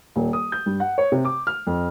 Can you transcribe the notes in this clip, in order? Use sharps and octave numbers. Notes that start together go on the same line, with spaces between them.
D#1
D#6
G6
G2
F#5
C#5
C3
D6
F6
F2